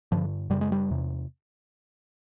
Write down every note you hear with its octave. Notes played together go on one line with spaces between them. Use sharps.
G2 D3 F3
F#2 C#3 G3
G#3
G3
E2 C3